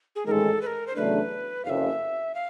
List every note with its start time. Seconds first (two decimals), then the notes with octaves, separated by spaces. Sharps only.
0.16 G#4
0.26 A1 G#2 D#3 G#3 A4 A#4
0.61 B4
0.66 A#4
0.87 C5
0.95 E2 C#3 F#3 A3 D4 B4
1.65 F#1 F2 C#3 E5 F5
2.35 F5